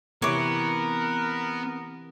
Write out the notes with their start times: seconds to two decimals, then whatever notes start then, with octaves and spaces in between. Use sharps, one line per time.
0.22 C3 E3 B3 C4 A#4 C#5 D6